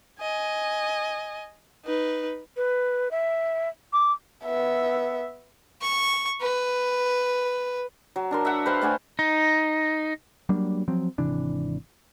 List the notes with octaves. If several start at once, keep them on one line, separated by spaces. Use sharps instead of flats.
D#5 G#5
D#4 B4
B4
E5
D6
B3 E5
C#6
B4
F#3
D4 A#4 C6
E5 F#5
B4 C5 F5 G5
A3 D4 F#5 G#5
D#4
F#3 G3 A#3 D4
F3 F#3 C4
G#1 C3 E3 D4